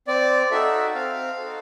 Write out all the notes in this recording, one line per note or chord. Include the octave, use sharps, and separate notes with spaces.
C4 D5
D#4 F#4 A4 E5
C4 F5
D#4 F#4 A4